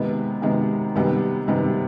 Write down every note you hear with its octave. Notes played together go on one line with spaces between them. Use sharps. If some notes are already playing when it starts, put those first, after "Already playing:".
Already playing: C3 D#3 G#3 B3
C3 D#3 G#3 B3
C3 D#3 G3 B3
C3 D#3 G3 B3